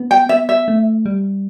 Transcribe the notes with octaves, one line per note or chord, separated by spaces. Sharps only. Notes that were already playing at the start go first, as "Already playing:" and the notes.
Already playing: B3
G5
B3 E5
E5
A3
G3